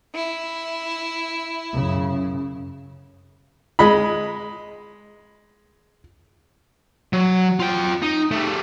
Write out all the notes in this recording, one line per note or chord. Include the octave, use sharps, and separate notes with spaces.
E4
F#2 C#3
G#3 D#5 B5
F#3
F4 G5
D#4
G3 A3